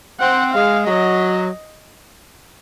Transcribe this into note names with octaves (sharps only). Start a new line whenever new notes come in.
C4 F#5
G#3 F5
F#3 D#5